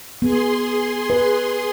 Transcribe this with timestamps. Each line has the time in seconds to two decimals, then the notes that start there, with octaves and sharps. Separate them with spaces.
0.22 B3 G#4 C6
1.10 B4